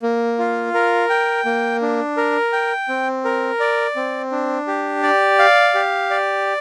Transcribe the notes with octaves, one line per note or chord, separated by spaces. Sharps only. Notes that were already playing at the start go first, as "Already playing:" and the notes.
A#3
F4
A#4
G5
A#3
D4
A#4
G5
C4
A#4
D5
C4
D4
G4
D5
F5
G4
D5